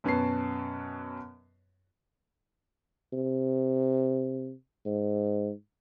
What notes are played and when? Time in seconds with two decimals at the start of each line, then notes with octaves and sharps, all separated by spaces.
0.04 F#2 B2 C#4 B4 A5 C7
3.13 C3
4.86 G#2